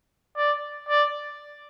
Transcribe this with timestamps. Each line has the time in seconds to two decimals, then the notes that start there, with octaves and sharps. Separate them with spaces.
0.36 D5
0.89 D5